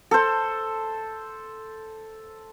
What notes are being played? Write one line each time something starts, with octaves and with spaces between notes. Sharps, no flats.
A4 C5